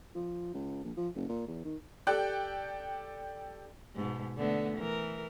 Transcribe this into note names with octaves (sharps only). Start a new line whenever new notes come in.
F3
C#2
A#1
F3
F#1
A#2
E2
D#3
G4 A4 D5 G5 F#6
G#2 B2
D3 A3 B3
E3 A#4